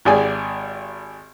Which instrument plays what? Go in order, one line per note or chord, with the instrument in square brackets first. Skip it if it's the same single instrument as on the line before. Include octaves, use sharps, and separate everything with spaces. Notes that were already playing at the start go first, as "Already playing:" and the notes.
[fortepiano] G#1 G4 G#4 D5 G#5